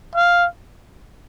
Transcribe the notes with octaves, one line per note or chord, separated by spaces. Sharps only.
F5